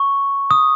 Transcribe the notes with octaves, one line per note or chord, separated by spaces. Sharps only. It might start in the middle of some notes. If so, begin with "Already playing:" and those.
Already playing: C#6
D#6